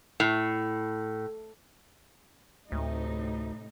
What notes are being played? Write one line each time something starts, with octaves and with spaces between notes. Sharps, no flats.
A2
D2 A2 C3 D#4